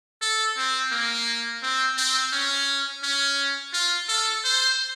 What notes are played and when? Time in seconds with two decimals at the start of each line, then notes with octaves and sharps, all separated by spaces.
0.22 A4
0.57 C4
0.92 A#3
1.63 C4
1.97 C4
2.33 C#4
3.03 C#4
3.73 F4
4.08 A4
4.44 C5